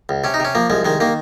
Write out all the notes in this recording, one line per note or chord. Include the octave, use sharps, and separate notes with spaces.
C#2
C3 C#4
D#4
C3 C#4
F3 A#3
C2 G#3
D#3 G#3
D#3 A#3